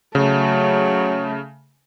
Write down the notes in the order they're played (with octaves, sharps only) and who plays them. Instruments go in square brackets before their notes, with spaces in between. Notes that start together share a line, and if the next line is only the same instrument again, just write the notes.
[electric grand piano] C#3 [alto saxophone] F#3 [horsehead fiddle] A3